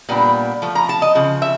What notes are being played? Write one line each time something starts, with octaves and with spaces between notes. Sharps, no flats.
A#2 G3 B3 D4
F3 A3
A#5
A5
D#5
C#3 F3
E5